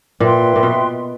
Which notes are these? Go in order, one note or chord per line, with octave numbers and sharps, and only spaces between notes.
A#2 B4 E5 G5 C6
A#2
B2